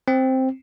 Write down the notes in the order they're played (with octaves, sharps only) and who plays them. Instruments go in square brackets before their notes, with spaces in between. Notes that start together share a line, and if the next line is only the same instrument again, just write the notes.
[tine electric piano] C4